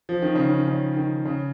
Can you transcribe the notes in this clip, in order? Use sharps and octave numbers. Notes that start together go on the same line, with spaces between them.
F3
D#3
C#3
D#3
C#3
D#3
C#3